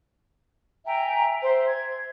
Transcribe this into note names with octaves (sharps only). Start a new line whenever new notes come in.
E5 G5 G#5 A#5
C5 E5
G#6